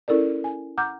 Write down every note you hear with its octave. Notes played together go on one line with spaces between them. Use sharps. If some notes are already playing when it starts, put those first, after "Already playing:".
C#4 E4 A4 A#4 D5
G#5
F#5 A#5 D6 F6 G6